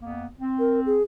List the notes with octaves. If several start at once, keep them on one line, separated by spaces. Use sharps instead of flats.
F2 A#3 B3
C4
A#4
G#4